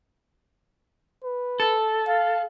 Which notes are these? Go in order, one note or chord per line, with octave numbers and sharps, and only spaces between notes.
B4
A4
F5